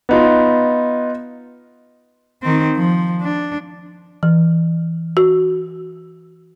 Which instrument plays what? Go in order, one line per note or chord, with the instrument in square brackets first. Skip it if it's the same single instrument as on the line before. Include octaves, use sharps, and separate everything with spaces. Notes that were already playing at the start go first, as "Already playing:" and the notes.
[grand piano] B3 D#4 F4
[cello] D#3 C4
F3
D4
[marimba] E3
F#4